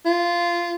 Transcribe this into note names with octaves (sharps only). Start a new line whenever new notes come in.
F4